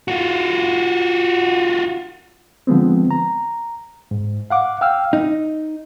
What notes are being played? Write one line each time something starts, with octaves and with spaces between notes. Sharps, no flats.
F4 F#4
D3 F3 G#3 B3 C4
A#5
G#2
F5 F#5 D6
F5 G5 E6 F6
D#4